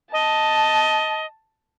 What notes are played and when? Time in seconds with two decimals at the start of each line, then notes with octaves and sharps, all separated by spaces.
0.13 D#5 A5